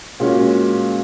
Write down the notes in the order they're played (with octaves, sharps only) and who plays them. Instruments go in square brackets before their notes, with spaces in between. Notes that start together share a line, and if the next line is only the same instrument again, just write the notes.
[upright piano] A#2 G#3 C#4 F#4